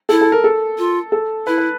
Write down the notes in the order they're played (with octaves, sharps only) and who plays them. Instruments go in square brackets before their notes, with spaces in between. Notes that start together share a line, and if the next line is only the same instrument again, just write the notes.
[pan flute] E4 [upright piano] A4
[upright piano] A4
A#4
A4
[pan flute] F4
[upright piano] A4
[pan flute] E4 [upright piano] B4
[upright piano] B4